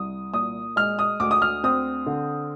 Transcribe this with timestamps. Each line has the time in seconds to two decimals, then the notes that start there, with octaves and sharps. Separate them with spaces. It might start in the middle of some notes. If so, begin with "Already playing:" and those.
Already playing: C2 D#6
0.33 A#2 D#6
0.76 G#3 F6
0.99 D#6
1.20 D2 D6
1.31 D#6
1.42 F6
1.64 C4 D#6
2.06 D3